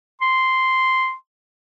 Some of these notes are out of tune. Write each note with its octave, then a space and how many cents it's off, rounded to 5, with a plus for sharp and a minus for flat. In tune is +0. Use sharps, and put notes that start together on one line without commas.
C6 -5